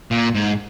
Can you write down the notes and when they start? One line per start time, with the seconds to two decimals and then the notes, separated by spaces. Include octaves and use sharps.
0.11 A#2
0.35 G#2